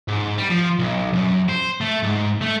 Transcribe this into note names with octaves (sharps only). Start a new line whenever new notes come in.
G#2
G3
F3
B1
F#2
C5
A3
G#2
A3